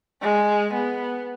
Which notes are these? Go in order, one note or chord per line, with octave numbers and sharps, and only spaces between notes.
G#3
B3